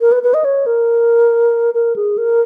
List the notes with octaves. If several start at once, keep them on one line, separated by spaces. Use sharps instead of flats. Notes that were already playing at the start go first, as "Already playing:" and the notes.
A#4
B4
B4
D#5
C#5
A#4
A#4
G#4
A#4